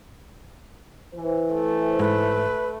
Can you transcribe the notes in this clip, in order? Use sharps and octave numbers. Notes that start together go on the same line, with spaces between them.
E3 C5
A3
G#2 B4